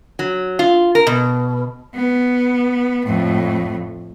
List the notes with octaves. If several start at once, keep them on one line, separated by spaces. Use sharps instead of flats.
F#3
F4
A#4
B2
B3
F2 A2